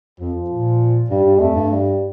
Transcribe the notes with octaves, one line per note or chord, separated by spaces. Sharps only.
F2 F3
A#2
G2 G3
G2
F2 A3
G2
G3